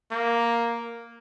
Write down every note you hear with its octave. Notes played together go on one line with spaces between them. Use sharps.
A#3